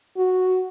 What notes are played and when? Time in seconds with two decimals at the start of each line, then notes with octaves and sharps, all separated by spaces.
0.17 F#4